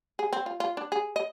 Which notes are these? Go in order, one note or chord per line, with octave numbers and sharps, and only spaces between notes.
G#4
C4
F4
F4
D4
G#4
D#5